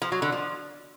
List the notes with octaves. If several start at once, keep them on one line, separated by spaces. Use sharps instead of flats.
F3
F#3
D3
F3